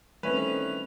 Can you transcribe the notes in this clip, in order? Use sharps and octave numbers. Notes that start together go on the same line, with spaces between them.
D#3 E3 G3 A3 C4 C#4 B4 F7